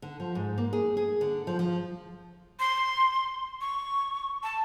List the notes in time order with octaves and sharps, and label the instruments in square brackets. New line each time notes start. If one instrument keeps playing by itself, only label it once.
[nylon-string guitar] D3
F3
G#2
A#3
G#4
G#4
D3
F3
F3
[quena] C6
C#6
A5